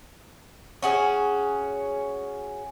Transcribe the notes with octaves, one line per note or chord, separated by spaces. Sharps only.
C#4 F#4 G#4